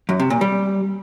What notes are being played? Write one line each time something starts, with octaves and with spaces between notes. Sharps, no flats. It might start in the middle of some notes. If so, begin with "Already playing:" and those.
F#2
C3
A#2
G3